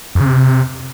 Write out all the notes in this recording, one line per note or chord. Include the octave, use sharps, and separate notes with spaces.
F2
C#3
C3